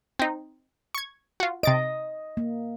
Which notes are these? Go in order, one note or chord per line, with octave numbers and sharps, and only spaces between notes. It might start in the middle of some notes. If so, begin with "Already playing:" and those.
C4 D#4
C#6 G#6
F4 F#4
C3 D#5 A6 D7
A#3